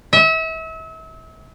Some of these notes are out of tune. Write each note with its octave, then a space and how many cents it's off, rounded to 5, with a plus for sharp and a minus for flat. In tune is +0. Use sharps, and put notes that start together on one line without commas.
E5 -35